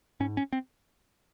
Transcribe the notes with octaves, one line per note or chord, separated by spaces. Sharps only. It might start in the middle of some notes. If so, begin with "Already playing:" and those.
G#2 C#4
C#4
C4